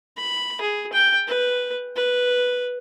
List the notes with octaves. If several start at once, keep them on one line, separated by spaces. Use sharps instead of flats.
B5
G#4
G5
B4
B4